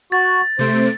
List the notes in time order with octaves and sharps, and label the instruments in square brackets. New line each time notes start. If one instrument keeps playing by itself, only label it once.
[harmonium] F#4 [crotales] A6
[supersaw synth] C3 A3 D7 [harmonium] C5